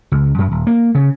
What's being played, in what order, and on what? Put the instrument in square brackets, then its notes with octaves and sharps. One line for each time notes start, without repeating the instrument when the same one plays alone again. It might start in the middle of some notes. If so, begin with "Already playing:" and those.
[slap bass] C#2
F#2
D#1
A#3
C#3